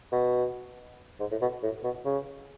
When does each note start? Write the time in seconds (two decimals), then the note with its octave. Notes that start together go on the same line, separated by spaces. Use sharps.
0.12 B2
1.20 G#2
1.31 A2
1.42 B2
1.63 A2
1.84 B2
2.05 C#3